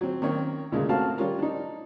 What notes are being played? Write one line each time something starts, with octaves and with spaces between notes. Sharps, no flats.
F#3 C4
D#3 A#3 C4 C#4 C#5
D2 A#2 C#3 G#3 A#3
A3 C4 F#4 A#4 F5 A5
G3 C#4 F4 A#4
D4 D#4